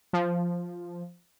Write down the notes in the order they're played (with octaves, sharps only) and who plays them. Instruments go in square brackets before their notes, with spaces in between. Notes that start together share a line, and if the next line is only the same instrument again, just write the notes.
[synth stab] F3